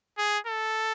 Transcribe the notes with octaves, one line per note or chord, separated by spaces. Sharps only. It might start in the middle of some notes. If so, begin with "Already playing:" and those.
G#4
A4